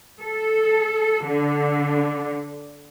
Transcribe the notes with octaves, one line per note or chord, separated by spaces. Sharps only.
A4
D3